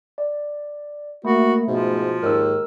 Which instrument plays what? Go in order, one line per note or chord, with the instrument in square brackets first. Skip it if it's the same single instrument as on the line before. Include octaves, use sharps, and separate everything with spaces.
[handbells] D5
[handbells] A3 [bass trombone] A#3 [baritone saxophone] F#4
[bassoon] G#2 [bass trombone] B2 [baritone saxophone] F3
[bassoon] D#2 [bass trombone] G#2 [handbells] A#4 E6